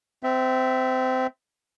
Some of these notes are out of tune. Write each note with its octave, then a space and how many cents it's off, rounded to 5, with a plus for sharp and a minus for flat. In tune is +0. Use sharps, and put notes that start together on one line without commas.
C4 -20 E5 +0